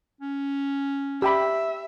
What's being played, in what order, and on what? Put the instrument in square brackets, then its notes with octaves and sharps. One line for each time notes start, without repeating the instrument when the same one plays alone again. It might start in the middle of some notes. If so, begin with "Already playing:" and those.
[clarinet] C#4
[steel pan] G4 G5 B5 [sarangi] E5